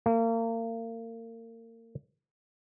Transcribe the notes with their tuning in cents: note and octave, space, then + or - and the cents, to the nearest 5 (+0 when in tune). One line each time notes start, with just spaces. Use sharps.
A#3 -35